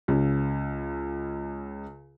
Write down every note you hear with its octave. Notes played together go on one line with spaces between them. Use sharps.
C#2 C#3